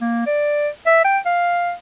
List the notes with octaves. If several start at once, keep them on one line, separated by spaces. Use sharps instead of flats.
A#3
D5
E5
G5
F5